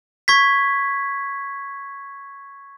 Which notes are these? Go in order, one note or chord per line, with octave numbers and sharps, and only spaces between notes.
C#6 G#6 B6